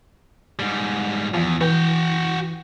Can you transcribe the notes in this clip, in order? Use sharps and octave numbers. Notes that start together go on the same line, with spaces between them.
G#2 G3
E2 F3
E3 F#4 G5